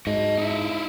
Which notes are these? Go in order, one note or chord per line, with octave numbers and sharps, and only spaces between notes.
G#2 F#4 D#5
D#4 E4 E5